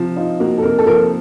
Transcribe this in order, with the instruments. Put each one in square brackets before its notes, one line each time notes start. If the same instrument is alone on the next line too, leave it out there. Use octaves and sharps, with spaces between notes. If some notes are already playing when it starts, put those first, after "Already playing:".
Already playing: [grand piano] C3 F3
[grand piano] D#4 [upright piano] F4
[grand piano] A#3 [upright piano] F#4
[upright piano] A4
[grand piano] C3 [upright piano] A#4
[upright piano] A4
[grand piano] F3 [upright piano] A#4
[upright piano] A4